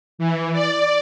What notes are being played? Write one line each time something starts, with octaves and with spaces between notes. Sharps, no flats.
E3
D5